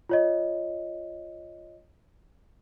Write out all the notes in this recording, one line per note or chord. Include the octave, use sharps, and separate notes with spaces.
F4 C#5 D#5